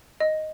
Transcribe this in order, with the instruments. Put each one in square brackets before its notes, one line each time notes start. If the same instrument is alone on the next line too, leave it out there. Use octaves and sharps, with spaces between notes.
[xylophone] D#5